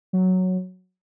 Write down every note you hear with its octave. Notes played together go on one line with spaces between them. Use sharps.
F#3